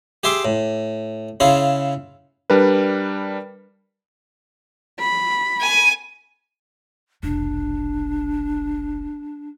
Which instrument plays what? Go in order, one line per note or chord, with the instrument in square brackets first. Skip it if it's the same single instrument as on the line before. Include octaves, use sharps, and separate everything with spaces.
[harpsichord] G4 G#4 E5 C6 D6
A2
C#3 E4 F4 G#4
[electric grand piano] G3 D4 A#4 B4
[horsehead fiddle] B5
[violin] G#5 D#7
[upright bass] F1 B1 [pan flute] D4